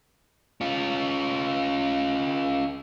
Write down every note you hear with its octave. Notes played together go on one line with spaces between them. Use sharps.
C#4 F4